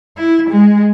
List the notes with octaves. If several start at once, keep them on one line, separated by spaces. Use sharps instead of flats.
E4
G#3